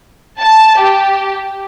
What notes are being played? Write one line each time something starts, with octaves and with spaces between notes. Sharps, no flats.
A5
G4